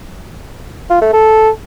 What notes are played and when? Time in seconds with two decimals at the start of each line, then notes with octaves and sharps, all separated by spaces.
0.90 F4
1.02 A3
1.13 A4